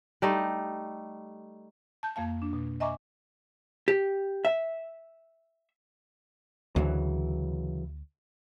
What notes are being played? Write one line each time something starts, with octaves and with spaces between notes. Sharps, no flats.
G3 A3 D#4
A5 G6
F2 A#3 F5 A5
D4
B2
D#5 E5 G#5 A#5 C#6 D6
G4
E5
D2 C#3 E3 F#3